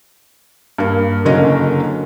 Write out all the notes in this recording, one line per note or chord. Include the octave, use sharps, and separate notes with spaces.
G2 A#3
F#1 D3 F#3 C#4 A#4 D#5